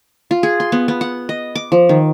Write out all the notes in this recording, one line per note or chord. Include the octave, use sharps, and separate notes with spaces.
F4
G#4
C6
B3
B3
F#5
D#5
D6
F3
D#3